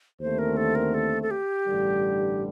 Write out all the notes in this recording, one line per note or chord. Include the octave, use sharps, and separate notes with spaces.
D#2 D3 A3 C4 C5
A#4
A4
A#4
A4
A4
G4
A1 G2 D3 G3